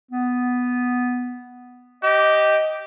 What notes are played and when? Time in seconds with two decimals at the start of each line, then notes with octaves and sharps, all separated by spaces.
0.11 B3
2.03 G4 D#5